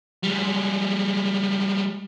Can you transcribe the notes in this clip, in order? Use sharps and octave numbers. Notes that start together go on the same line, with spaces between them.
G3 G#3